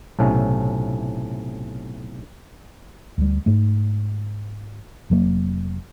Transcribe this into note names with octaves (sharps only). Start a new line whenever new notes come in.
B1 A2 C3 C#4
D2 G3
G#2 A3
F1 F#3 A#3